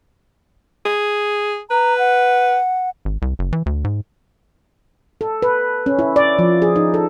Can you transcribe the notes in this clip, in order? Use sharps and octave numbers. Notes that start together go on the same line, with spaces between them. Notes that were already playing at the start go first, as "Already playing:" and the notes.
G#4
B4 A#5
F#5
G#1
C2
F#1
E3
D2
G#2
A4
B4
C#4
E4
D5
F3
G#4
D#4
A4